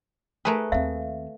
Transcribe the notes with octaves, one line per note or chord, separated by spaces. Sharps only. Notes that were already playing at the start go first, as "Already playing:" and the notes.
A3 G#4 A#4 B4
D#2 C4 E5 F5